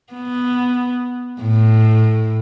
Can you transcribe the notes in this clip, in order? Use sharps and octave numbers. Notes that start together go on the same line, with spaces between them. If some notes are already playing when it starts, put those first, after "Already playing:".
B3
A2